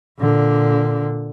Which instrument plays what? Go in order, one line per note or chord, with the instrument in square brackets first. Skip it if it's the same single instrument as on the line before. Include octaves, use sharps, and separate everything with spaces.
[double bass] A#2 D3